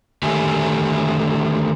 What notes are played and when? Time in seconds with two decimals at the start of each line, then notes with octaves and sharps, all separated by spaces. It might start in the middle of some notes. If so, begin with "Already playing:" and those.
0.23 D3 D#3 A3 E4 G4 G#5